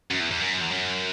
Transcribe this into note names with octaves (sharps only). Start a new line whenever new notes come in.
F#2
E2
E2
F#2
E2
F#2